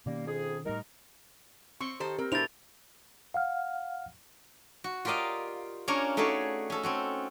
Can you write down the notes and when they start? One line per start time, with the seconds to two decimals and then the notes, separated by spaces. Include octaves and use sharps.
0.06 B2 D#3 G3 A#3 C#4
0.27 F2 G#4
0.66 A2 G3 D#4 A#4
1.81 C4 C6 C#6
2.00 D#3 G4 A4 C5
2.19 C4 A#4
2.32 B2 D4 E4 A#4 C5 A6 F7
3.34 F5 F#5 F6
4.84 F#4
5.05 F4 G4 A#4 D5 D#5 F5
5.88 A#3 C#4 D4 A#4 C#5 A#5
6.17 A3 D#4 F#4 G#4 C#5 D5
6.70 C#4 A4
6.83 C4 C#4 F#4